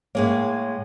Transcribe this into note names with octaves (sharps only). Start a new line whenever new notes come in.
A2 G#3 A#3 C#5